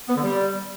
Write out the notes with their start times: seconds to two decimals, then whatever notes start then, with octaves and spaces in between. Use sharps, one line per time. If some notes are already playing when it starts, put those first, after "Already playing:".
0.09 B3
0.16 D3
0.23 G3